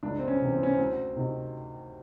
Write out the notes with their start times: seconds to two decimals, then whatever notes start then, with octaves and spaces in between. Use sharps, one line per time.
0.03 C#2 D4
0.19 C4
0.28 C#4
0.40 C3 E3
0.53 C4
0.63 C#4
0.73 D2 C4
1.16 C3 D#3